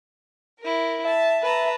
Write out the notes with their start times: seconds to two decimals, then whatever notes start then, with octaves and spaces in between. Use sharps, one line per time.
0.60 E4 A#4
1.05 E5 A5
1.44 B4 A5 A#5